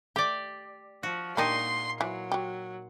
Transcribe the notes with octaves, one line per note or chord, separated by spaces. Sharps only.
A3 G4 D5
F3 F#4
A#2 A#3 D4 D#4 G4 C6
E3 F#3
F#4 G4